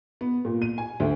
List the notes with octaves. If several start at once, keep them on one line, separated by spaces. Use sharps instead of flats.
B3
A#2
D#7
G#5
D2